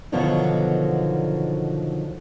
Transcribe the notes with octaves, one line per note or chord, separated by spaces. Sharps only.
B2 D3 D#3 F3 F#3 B3